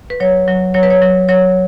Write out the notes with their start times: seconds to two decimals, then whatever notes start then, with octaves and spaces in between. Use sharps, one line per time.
0.10 B4
0.20 F#3 C#5
0.48 F#3
0.74 F#3 C#5
0.83 B4
0.90 C#5
1.02 F#3
1.29 F#3 C#5